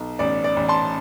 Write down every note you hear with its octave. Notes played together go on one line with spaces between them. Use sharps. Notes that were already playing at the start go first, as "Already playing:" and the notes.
Already playing: B1
A1 D5
D5
A1
A5 C6